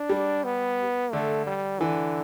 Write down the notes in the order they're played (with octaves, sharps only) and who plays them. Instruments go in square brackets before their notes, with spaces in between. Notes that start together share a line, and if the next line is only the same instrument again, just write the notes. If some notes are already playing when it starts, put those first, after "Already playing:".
Already playing: [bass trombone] D4
[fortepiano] G3
[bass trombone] B3
[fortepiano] D3 [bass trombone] A3
[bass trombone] G3
[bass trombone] D3 [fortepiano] E3